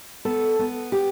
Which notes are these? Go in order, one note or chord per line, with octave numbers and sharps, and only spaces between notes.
B3 A4
B3
G4